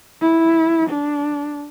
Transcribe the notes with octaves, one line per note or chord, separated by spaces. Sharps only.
E4
D4